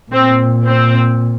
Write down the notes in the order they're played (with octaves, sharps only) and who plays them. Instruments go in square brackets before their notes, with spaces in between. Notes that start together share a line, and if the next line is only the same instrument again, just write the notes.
[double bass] A#2 [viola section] C4
[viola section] C4